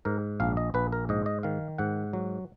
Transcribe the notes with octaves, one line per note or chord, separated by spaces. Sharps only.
G#2 A#4
A#1 F5
D#5
A#1 B4
A#4
G#2 D#5
D#5
D#3 F5
G#2 F#5
F#3